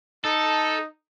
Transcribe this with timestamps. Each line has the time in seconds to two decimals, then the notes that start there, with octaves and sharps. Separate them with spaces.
0.24 D#4 A4